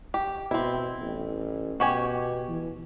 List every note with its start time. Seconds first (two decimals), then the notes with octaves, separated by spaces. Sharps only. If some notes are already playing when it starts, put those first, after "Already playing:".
0.14 G4
0.51 B2 C4 E4
1.01 A1
1.80 B2 F#4 G4 G#5
2.49 E3